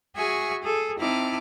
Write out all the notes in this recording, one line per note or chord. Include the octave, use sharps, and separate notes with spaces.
F#4 G#4 E5 G#5 C#6
G#4 A4
C4 D#4 E4 A5 D6 F6